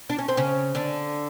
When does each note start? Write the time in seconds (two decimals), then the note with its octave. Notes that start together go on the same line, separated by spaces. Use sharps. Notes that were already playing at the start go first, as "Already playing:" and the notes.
0.09 D4
0.19 C#4
0.28 C4
0.37 C#3 C#4
0.75 D3 D4